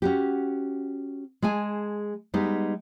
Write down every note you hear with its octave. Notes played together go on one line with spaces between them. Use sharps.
C#4 F#4 G4
G#3 G#4 G#5 A5
G3 G#3 B3 D#4